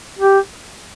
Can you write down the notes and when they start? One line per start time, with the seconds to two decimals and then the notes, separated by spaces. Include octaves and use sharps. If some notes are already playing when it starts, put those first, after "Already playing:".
0.19 G4